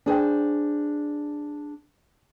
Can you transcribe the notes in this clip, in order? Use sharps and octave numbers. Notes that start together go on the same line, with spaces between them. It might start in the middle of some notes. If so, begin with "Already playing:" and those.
D4 G#4 C5 G5